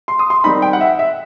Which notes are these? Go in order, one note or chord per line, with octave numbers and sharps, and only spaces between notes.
C6
D#6
C6
D#3 G3 C4 D#4 B5
G5
F#5
E5
E5